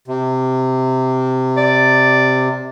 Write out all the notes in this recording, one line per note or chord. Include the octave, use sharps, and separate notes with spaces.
C3
D5